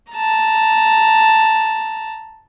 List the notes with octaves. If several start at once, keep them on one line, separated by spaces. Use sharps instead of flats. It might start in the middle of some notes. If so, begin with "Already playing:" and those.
A5 A#5